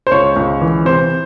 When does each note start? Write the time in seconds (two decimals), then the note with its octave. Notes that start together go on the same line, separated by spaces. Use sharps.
0.07 C5
0.11 C#2 C#5
0.36 C#2
0.61 E3
0.85 C3 C5